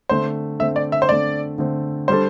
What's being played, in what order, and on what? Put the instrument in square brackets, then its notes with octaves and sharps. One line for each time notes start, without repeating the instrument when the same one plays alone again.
[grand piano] D3 A3 C4 [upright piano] C5
[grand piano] D3 A3 C4 [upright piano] E5
[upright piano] D5
E5
C5
[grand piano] D3 A3 C4 [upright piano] D5
[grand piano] D3 A3 C4
[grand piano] G3 D4 A4 [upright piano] C5